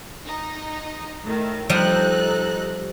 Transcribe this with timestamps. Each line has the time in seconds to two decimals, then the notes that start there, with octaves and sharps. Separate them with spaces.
0.25 D#4
1.23 A2 D#3 A3
1.70 F3 G3 D#4 A4 F#6